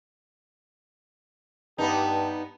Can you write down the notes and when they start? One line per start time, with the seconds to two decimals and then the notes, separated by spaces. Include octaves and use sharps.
1.78 G2 B3 D#4 G4 A5